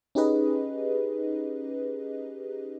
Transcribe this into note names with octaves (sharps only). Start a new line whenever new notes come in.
C#4 D#4 G4 G#4 B4 D#5